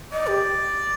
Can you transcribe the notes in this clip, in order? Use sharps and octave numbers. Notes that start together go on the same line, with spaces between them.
D5 D#5
G4